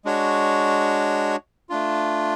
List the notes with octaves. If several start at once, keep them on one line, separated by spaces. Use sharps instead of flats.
G#3 D4 F#4 C#5
A3 D4 F4